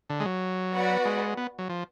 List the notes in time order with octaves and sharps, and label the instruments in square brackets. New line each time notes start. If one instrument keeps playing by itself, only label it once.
[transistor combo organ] D3
G#3
F#3
[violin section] B3 F#4 B4 D5 F#5
[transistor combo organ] G#3
B3
F#3
F3